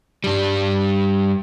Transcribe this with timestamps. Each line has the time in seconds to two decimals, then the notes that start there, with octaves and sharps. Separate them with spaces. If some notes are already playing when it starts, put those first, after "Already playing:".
0.24 G2 G3